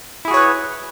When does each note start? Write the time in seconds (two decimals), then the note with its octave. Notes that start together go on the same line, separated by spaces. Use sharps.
0.25 E4
0.28 G#4
0.31 F#4
0.34 C#5
0.37 B4